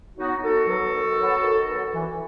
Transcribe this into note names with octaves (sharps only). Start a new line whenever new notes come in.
F#3 B3 D#4 F#4
D#3 F#4 A4
F#3 B3
D#3
F#3 B3
D#3
F#3 B3
E3